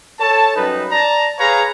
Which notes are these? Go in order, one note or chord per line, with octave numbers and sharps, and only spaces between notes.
A4 C#5 A5
F#2 G3 D#4 B4
D5 A5 A#5
G#4 B4 C#5 F5 A#5